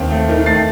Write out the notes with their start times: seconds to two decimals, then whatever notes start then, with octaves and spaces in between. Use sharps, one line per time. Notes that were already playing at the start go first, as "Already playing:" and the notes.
Already playing: D#2 C4
0.11 A3
0.29 D#3
0.46 A3 A6 C7